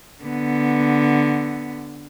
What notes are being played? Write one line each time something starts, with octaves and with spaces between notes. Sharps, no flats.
D3 B3